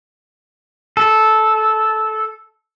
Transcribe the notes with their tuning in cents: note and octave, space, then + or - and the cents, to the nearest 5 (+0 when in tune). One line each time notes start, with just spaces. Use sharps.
A4 -10